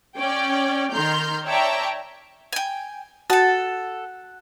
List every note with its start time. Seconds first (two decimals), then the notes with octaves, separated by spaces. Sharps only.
0.16 C#4 D5 G5
0.93 D#3 A#5 C6 F6 G6
1.46 C#5 D5 E5 G5 A5 A#5
2.53 G5 G#5
3.30 F#4 A4 F#5 A5